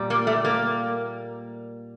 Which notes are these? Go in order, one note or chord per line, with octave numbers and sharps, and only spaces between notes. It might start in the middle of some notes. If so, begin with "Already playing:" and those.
Already playing: A#2 G3
A#3
A3
A#3